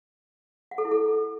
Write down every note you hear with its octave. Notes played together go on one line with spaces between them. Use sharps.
F#5
A4
E4
A4